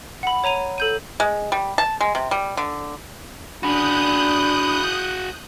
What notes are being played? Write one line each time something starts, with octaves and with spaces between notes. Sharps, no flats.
F#5 B5
C#5 A#5 D#7 F7
A4 G6 D#7
G#3
G3
A5
G#3
C3
G3
D3
D4 F#4 G#4 B5 D#6 F#6 G6